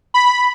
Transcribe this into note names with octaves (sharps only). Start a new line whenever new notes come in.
B5